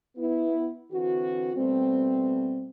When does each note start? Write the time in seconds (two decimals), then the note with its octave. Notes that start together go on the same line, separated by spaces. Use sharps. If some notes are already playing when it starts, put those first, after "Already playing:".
0.17 B3 E4
0.92 D3 E3 C4 F#4
1.55 B2 G3 A3 C4